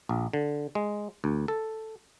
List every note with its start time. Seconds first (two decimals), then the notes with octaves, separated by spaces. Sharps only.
0.09 A#1
0.33 D3
0.75 G#3
1.24 D2
1.48 A4